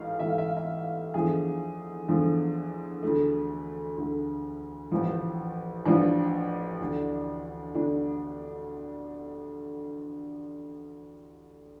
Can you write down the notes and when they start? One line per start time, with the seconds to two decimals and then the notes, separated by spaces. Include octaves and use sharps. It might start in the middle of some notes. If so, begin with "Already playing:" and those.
Already playing: A1 G#2 A3 F5
0.19 A1 G#2 E3 A3 E5
0.29 F5
0.38 E5
0.48 F5
0.57 E5
1.14 E2 D3 F3 A3 G#4
2.08 E2 D3 F3 A3
3.03 D2 D3 A3
3.97 D2 D3 A3
4.91 A1 A2 F3
5.85 A1 A2 F3 D4
6.80 D2 D3 A3
7.74 D2 D3 A3 D4